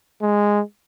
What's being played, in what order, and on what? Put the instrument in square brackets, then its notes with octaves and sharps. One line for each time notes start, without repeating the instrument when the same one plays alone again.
[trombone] G#3